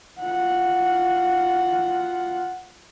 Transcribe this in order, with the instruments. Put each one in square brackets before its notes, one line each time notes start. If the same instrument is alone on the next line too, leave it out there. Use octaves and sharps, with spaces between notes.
[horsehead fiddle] F4 F#5